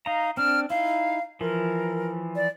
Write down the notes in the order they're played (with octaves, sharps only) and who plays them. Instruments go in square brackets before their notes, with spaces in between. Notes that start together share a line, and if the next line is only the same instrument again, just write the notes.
[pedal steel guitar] D#4 A#5 [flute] F5
[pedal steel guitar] C4 D4 [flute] F6
[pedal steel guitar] D#4 E4 [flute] F5
[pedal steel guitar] E3 F3 [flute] A#4
[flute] D5